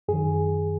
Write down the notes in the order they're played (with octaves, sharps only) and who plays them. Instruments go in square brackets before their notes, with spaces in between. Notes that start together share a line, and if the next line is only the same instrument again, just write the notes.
[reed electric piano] F#2 D#3 G#4